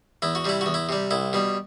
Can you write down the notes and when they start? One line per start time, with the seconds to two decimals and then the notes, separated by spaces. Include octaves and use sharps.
0.22 E2 E4
0.35 F#4
0.45 C3 G3 E4
0.61 E2 F#4
0.74 E4
0.89 C3 G3
1.11 C2 E4
1.33 B2 G3